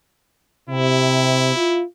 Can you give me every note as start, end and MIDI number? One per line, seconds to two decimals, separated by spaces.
0.69 1.53 48
0.69 1.84 64
1.56 1.82 65